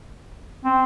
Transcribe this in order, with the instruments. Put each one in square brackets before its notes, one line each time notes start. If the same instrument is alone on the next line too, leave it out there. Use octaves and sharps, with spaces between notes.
[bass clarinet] C4